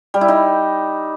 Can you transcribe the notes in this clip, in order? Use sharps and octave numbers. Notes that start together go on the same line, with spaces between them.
G3
E4
D#4